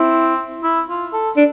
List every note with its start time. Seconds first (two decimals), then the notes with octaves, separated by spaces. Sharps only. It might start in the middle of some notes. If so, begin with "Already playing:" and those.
Already playing: C4 E4
0.63 E4
0.89 F4
1.13 A4
1.37 D4